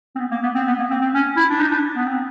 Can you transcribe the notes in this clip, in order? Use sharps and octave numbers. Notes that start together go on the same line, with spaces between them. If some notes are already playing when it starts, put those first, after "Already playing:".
C4
B3
A#3
B3
C4
B3
A#3
C4
C4
C#4
E4
D4
D#4
D4
B3
C4